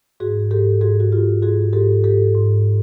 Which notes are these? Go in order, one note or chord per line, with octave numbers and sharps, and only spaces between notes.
G#2 F#4 G#4
G#2 G4 A4
G#2 F#4 G#4
F#4
G#2 F4 G4
G#2 F#4 G#4
G#2 G4 A4
G#2 G4 A4
G#2